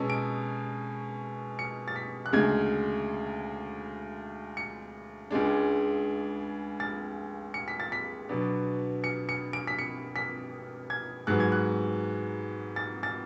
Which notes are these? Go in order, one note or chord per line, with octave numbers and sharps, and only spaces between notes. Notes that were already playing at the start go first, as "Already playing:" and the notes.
Already playing: B2 G#3 C#4 A5 E6
D7
C#7
A6
B6
F#6
D2 C#3 G#3 G#6
C#7
C#2 C#3 G#3 D4
A6
C#7
B6
A6
B6
B2 F#3 B3 D4
C#7
C#7
D7
B6
C#7
B6
G#6
G#2 F#3 B3 F#6
G#6
F#6
A6
A6